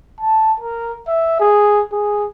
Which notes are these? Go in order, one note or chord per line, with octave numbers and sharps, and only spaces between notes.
A5
A#4
E5
G#4
G#4